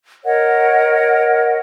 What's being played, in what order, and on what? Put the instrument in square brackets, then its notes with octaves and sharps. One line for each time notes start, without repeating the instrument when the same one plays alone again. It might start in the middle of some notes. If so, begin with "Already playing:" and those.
[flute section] A#4 C#5 D#5 F#5